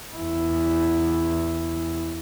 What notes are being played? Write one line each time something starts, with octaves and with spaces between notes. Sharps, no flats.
E2 E4